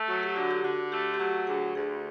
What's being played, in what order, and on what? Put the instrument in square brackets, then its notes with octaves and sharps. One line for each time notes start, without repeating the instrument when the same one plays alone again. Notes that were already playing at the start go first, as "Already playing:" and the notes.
Already playing: [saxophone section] A3
[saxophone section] F#3 [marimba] F#4
[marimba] G4
[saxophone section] D3 [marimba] F#4
[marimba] G4
[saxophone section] D3 [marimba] F#4
[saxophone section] A3 [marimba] G4
[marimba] G4
[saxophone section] F#3 [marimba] F#4
[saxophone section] D2 [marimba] G#4
[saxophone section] D2 [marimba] G#4